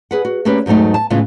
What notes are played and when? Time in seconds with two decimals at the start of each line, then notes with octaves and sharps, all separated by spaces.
0.11 G#4 B4 F#5
0.25 F#4
0.45 A3 A#3 C#4 G4 B4
0.66 E2 G#2 F#3 A3 D#4
0.94 A5
1.10 A2 C#3 E3 G#3 B3 F4